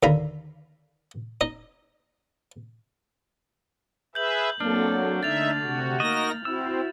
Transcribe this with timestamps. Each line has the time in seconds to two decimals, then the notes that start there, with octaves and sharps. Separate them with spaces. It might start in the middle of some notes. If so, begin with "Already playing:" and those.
0.03 D#2 D3 F5 A#5 B5
1.41 D#4 D#5
4.15 G#4 B4 E5 G6 F#7
4.60 F#3 A#3 C4 D4 A4 F6
5.23 D3 A3 D#4 E5 A6 F7
5.62 C3 F#4
6.00 A#3 D#4 F#4 A#4 D#5 A#6
6.45 C4 E4 F#4 E6